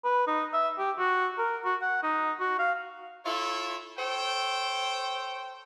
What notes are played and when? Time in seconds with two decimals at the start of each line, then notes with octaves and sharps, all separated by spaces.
0.04 B4
0.27 D#4
0.53 E5
0.78 G4
0.98 F#4
1.38 A#4
1.65 F#4
1.82 F#5
2.03 D#4
2.40 F#4
2.59 F5
3.26 E4 F4 A4 C#5 E5
3.98 A4 C5 C#5 G5